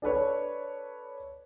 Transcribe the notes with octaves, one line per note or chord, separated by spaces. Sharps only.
D4 A4 B4 C#5